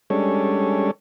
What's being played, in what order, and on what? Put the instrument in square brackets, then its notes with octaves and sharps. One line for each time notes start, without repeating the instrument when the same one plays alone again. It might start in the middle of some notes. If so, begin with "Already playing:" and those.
[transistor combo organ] G3 G#3 C#4 D4 A4 C#5